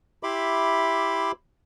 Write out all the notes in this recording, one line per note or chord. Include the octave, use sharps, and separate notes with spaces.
E4 G4 E5 B5 C6 D6